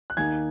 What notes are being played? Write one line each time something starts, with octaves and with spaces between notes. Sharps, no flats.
F#6
D#2 D#3 A#3 D#4 G#5 G#6